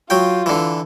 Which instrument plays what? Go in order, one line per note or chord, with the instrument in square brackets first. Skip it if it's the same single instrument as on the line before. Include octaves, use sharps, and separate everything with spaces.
[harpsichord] F#3 G5 [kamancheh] F4
[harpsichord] D3 E3